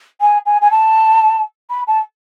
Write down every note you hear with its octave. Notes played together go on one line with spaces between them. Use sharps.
G#5
G#5
G#5
A5
B5
A5